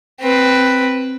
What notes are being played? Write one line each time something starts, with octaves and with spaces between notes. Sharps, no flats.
C4 B4